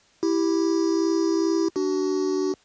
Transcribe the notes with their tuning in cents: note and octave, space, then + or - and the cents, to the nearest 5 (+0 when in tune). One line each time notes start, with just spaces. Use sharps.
E4 +0 G4 +0
D4 +0 F#4 +30